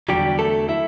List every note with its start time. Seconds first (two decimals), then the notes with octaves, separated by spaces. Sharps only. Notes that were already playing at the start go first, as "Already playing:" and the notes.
0.09 E2 D3 F#3 G3 G4
0.39 A3 A4
0.69 E4 E5